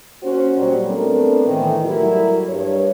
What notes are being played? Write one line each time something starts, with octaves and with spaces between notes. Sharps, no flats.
A#3 C#4 F#4 C5
A#2 F#3 G3
A3 B3 C4 D4 A4 A#4
A2 D#3 E3
F#3 G3 A3 E4 G4 A#4
G2 C#5